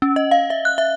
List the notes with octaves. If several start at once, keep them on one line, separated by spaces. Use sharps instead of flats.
C#4
D#5
F5
E5
F#6
E5